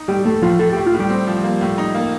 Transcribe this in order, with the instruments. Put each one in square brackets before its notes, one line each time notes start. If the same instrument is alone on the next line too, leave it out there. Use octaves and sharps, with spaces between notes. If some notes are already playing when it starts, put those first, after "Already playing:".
Already playing: [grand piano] D#4
[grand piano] A2 [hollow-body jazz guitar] G3 G4
[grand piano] A2 [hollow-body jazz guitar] A3 A4
[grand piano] A2 [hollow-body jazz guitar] F3 F4
[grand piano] A2 [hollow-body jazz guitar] A4
[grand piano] A2 [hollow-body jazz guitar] G4
[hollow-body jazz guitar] F4
[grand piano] A2
[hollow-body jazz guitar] G3 G4
[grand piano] C4
F3
A#3
A2
D#4
A#3